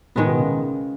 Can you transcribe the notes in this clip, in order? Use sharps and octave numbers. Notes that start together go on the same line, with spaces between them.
A2 D#3 G#3 B3
B2
C#3